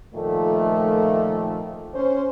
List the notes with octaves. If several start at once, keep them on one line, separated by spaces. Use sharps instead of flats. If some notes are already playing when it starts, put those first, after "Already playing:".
A#2 D#3 F3 A3
C#4 C5